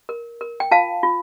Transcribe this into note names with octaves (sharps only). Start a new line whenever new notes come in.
A#4
A#4
G5
F4 F5 A5
F4